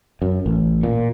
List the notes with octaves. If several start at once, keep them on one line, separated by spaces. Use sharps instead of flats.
F#2
A1
A#2